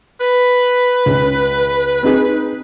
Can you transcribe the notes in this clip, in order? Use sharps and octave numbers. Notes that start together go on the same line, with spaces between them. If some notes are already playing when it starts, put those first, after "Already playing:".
B4
C#2 C#4
C4 D#4 G#4